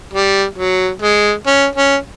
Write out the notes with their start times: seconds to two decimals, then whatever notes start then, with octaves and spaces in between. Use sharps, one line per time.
0.14 G3
0.58 F#3
1.02 G#3
1.47 C#4
1.75 C#4